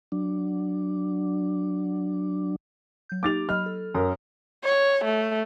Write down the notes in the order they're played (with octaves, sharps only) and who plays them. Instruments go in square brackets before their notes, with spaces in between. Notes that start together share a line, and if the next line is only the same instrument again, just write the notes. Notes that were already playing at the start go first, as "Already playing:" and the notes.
[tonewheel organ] F#3 D4
[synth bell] F#3 G6
[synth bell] A#3 D#4 G4 [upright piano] D6 A6 F7
[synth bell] F#3 D#5 B5 [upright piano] F6
[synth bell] A4
[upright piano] F#2 [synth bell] A#4 A#5 D#6
[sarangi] C#5
A3